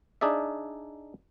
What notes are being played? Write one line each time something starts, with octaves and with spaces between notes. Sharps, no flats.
D4 D#4 G#4 D5 E5